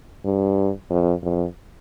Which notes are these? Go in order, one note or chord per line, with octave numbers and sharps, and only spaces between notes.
G2
F2
F2